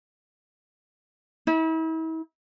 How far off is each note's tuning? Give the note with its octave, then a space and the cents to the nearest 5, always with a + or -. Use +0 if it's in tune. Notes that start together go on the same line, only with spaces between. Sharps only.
E4 -40